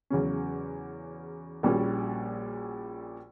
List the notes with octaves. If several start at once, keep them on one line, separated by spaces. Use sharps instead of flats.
E2 C#3 F#3 C#4
A#1 A#2 G3 C#4 F#4